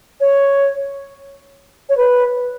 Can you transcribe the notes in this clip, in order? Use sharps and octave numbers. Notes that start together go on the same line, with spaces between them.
C#5
C#5
B4